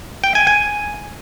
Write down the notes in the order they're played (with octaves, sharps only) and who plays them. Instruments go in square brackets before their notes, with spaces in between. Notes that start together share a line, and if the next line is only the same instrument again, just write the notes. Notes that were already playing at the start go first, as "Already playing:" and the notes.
[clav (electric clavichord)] G5
G#5
G#5